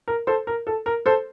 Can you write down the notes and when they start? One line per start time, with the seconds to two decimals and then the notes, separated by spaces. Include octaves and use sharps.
0.08 A#4
0.27 A4 C5
0.47 A#4
0.67 A4
0.86 A#4
1.06 A4 C5